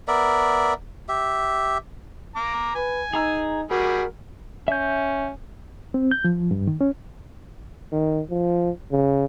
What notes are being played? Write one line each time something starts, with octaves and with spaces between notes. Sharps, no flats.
B3 A#4 D5 E5
G4 E5
A#5 D6
B4 G#5
D#4 G#4 A#5 E6
G3 F#4 G#4 A#4 B5
C#4 E5 G6
C4
G6
F3
G2
D#3
C#4
D#3
F3
C#3